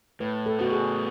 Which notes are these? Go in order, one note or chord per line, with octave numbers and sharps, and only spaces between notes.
A2 B4
A4
B3 F#4
G#4